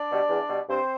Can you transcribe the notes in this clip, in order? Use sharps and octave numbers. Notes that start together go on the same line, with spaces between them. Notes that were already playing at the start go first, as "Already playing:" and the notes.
Already playing: D4 D5
B2 G3
E2
B2 G3
G2 C4 C5